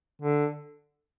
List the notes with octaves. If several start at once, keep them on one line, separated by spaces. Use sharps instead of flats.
D3